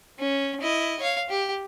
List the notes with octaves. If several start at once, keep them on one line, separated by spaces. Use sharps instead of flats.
C#4
E4 D#5
C#5 F5
G4